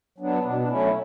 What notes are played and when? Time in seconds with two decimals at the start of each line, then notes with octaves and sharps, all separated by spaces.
0.18 F#3 B3 D4
0.44 B2 D4
0.60 D4
0.68 F#3 A3 C#4 E4